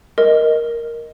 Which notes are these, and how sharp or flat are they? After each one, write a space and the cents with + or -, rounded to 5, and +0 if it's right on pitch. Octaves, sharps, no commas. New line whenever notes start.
A#4 +0 D#5 +0